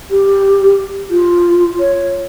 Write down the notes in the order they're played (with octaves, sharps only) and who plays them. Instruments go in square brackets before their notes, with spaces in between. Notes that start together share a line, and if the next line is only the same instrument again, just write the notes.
[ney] G4
F4
C#5